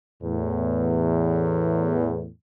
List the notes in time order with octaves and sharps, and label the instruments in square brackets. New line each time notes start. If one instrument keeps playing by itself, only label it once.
[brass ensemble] E2 A2